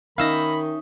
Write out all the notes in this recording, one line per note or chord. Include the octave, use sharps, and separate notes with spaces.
D#3 C#4 D#4 E5 F5 B5 E6 A#6